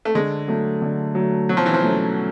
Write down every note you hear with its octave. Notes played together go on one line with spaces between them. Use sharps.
A3
D3 G#3
F#3 A3
D3
F#3 A3
B2 F#3
F3
E3
F3
F#3 A3 C#4